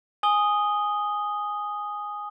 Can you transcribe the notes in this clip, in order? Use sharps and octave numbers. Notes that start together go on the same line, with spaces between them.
G#5 D#6 G7